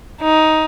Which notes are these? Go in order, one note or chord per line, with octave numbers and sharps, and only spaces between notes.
D#4